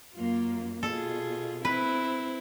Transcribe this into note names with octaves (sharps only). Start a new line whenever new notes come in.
F#2 A#3 F4
B2 F4 G#4 A4
C4 E4 B4